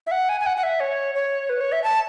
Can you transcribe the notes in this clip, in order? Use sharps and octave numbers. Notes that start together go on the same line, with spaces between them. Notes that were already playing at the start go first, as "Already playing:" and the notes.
E5
F#5
G#5
G#5
F#5
F#5
E5
C#5
C#5
B4
C#5
E5
A5